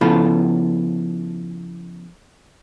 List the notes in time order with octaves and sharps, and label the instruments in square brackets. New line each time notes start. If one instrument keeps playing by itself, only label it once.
[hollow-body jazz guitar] C#3 F3 B3 E4 F4 A4